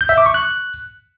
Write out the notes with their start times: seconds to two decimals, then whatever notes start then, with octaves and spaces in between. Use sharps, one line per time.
0.01 G6
0.09 E5
0.18 D6
0.26 C#6
0.34 F#6